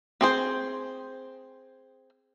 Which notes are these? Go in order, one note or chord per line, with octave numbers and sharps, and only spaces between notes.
C4 G#4 C5